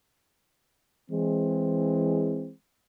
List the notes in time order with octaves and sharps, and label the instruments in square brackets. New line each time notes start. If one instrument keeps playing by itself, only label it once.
[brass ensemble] E3 G#3 C4